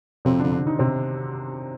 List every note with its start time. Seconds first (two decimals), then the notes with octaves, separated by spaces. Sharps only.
0.25 F2 C3 C4
0.39 D3 D4
0.44 F2
0.52 D3 D4
0.66 D#3 D#4
0.79 C3 C4